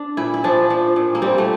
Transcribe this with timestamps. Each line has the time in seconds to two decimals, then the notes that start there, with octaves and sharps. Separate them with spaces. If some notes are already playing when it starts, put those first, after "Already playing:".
Already playing: D4
0.17 A#2 E4
0.34 E4
0.44 F3 D4
0.70 F3
0.96 A#2
1.15 A#3
1.22 G3 C4
1.38 A3